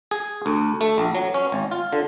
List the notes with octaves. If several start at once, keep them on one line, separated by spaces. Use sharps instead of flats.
G#4
D2
A3
A#1
F#3
C#4
G#1
F4
D3